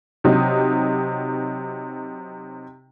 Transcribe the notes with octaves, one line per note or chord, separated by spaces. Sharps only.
C3 F#3 D#4 G4